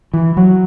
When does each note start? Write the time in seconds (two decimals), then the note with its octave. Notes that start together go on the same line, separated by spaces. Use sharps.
0.14 E3
0.37 F#3